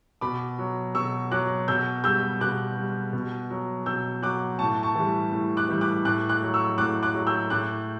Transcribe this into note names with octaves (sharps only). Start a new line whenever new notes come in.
B2 B5 D6
F#3
B2 C#6 E6
F#3 D6 F#6
B2 E6 G6
G3 E6 G6
B2 D6 F#6
G3
B2
F#3
B2 E6 G6
F#3 D6 F#6
A2 A5 C#6
A5 C#6
E3 G3
A2
D6 F#6
E3 G3
D6 F#6
A2 D6 F#6
D6 F#6
F#3
C#6 E6
A2 D6 F#6
D6 F#6
F#3
E6 G6
A2 D6 F#6